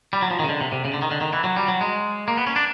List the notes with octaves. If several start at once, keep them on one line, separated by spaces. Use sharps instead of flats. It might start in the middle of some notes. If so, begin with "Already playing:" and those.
G3
F#3
F3
D#3
C#3
D3
C3
C3
C#3
D3
D#3
D3
D#3
E3
F#3
G3
F#3
G#3
A#3
B3
C#4
D4